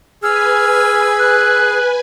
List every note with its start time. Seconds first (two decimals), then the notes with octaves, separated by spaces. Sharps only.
0.23 G#4 B4 G#5 E6 F6
1.19 F#6